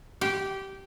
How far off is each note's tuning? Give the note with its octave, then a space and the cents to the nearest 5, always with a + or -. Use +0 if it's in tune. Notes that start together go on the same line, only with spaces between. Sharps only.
G4 -15